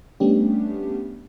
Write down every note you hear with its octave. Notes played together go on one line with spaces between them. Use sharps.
G3 A3 B3 C#4 D4 G4